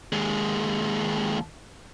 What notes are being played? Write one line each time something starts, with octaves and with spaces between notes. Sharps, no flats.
D#2 G#3